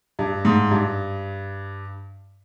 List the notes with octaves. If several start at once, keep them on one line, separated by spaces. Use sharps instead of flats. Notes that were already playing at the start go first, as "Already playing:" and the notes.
G2
G#2
G2